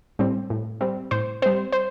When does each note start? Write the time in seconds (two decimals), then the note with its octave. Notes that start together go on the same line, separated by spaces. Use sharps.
0.19 A2 G3 C4
0.50 A2
0.81 G3 C4
1.11 A2 C5
1.42 G3 C4 C5
1.72 C5